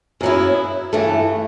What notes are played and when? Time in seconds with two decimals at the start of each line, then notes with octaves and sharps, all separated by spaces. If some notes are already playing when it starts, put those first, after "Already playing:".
0.21 F#2 F#3 B3 E4
0.93 G2 E3 A3